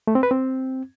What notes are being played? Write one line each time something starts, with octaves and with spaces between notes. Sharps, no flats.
A3
C4
B4
C4